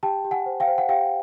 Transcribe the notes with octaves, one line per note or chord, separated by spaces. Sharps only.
G4 G5 A5
G4
F#5 G#5
C5
F5 G5
C5
F#5
G4 F5 G5